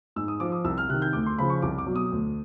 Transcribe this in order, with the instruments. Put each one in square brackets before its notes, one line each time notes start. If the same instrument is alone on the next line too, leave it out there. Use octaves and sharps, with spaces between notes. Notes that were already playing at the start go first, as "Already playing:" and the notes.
[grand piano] G#2 E6
D#6
F3 D6
D#6
C2 E6
F6
C3 D#3 F#6
G6
D2 D6
C6
C#3 F3 B5
C#6
C2 D6
D6
B2 F#3
D#6
D2